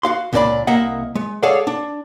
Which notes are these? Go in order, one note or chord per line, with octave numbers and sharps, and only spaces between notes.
F#4 F5 C6
C#2 A#2 A#3 D4 D5 B5
C2 A#3 D#5 E5 F#5
G#3
G#4 A4 C#5 D5 F5 F#5
D4